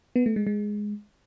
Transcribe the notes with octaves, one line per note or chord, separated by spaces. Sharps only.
B3
A3
G#3
G#3